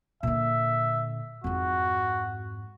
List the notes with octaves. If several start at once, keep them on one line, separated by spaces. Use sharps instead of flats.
A#2 D3 E5
F2 G#2 F#4